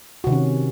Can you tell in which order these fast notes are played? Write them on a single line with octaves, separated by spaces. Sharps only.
F#4 C3 D#3 C#4